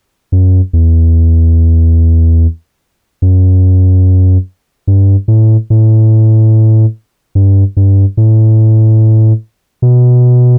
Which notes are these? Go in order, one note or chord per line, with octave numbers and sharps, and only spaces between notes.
F#2
E2
F#2
G2
A2
A2
G2
G2
A2
B2